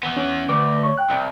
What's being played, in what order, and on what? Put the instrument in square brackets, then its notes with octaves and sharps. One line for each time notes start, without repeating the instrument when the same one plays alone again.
[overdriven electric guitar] E3 B3
[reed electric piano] C#4
[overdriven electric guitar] D2 [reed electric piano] B4 D6
[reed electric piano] C#5 C#6
G5 F#6
[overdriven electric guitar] C2